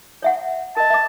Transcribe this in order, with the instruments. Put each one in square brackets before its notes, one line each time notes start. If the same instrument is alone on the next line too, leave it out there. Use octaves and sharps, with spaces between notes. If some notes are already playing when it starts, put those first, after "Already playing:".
[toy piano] C#5 E5 F#5
[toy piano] A#4 D#5 [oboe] A5
[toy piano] E5 D6